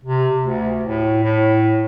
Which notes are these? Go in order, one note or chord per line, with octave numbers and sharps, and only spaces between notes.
C3
D2
A2
A2